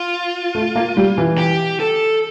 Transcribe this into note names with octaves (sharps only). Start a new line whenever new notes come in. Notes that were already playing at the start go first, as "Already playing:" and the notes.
Already playing: F4
A3
A#3
G3
E3
G4
A4